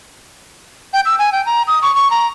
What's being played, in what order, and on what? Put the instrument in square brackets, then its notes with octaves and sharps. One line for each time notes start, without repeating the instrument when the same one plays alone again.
[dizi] G5
E6
G#5
G5
A#5
D#6
C#6
C#6
A#5